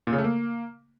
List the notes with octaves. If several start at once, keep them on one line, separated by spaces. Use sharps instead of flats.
A#2
C#3
A3
A#3